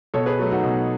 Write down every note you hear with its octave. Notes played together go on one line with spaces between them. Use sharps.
B2 A4 C#5
G#4 B4
F#3 A3
D#4 F#4
B2